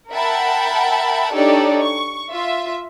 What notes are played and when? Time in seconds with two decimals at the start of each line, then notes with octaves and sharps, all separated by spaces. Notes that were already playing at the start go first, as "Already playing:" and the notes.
0.11 A#4 E5 F#5 G5 A5 B5
1.34 D4 D#4 G4 A4 C#5 D5
1.81 C#6
2.32 F4 E5